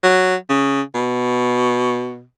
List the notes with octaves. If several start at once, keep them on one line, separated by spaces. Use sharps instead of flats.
F#3
C#3
B2